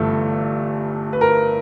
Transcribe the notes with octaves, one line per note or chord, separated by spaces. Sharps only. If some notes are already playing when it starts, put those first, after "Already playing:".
Already playing: G1 G2 E3 A3 A4
B4
A#4